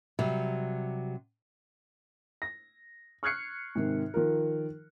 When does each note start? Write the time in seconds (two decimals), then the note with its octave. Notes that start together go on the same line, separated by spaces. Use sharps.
0.19 C3 F#3 G3
2.42 A#6
3.23 C#6 F6 F#6 G#6 C7 C#7
3.75 G#2 C3 D#3
4.14 D#3 F3 F4 A#4